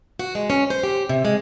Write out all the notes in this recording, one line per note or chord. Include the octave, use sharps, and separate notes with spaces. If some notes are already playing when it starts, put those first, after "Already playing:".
F#4
G#3
C#4
C5
G4
C3
G#3